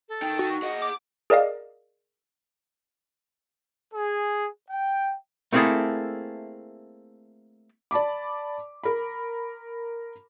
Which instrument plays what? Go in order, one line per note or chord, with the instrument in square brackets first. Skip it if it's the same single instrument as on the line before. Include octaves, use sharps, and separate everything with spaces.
[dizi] A4
[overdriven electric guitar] D#4 G5
[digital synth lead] F#4
[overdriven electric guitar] G#4 F#5 [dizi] D#5
[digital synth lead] D6
[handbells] G#4 A#4 D5 D#5 F5
[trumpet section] G#4
G5
[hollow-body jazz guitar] A3 A#3 C4 E4 G#4 A4
[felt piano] D5 A5 B5 D6
A#4 B5